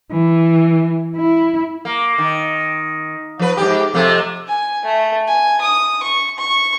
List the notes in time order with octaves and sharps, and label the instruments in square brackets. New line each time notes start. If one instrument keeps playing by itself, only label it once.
[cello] E3
E4
[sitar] A#3
D#3
F3 B4
G#2 B2 G4
F2 C3 A3
[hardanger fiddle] G#5
A3
G#5
D#6
C#6
C#6